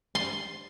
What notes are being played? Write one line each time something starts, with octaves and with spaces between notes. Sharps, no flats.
C6